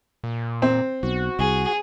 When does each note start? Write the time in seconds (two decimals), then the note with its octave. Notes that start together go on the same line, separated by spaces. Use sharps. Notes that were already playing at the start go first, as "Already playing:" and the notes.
0.24 A#2
0.62 C4
1.03 B1 F#4
1.39 C2 G#4